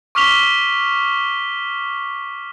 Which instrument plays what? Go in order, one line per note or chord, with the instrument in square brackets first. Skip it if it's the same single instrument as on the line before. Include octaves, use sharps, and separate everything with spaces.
[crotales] C#6 D6 F6 B6 F7 G7